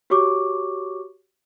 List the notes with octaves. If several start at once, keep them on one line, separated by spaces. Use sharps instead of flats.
F#4 G4 C#5 C#6 D6